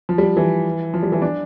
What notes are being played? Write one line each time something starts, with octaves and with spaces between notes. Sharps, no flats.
F3
G3
E3
F3
G3
E3
D4